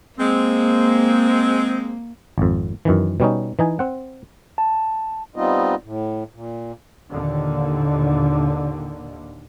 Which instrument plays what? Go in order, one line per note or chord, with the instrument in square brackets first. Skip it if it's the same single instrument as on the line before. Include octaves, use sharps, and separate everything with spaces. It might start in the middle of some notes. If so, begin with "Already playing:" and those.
[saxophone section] G#3 C4 [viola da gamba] A#3
[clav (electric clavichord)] G#1 F2
F#2 D#3 E3
B2 G3 C#4 D#4
E3 D#4 G#5
C4 F#5
[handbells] A5
[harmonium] G3 B3 C4 D#4 F4 D#5
A2
A#2
[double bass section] D#2 A#2 D3 D#3